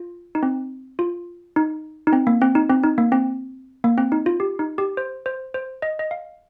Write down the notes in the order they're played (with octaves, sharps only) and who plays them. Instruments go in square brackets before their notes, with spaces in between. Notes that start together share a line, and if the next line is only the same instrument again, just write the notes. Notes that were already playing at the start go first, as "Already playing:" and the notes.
Already playing: [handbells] F4
D#4
C4
F4
D#4
D#4
C4
A#3
C4
D#4
C4
D#4
A#3
C4
A#3
C4
D#4
F4
G4
D#4
G4
C5
C5
C5
D#5
D#5
F5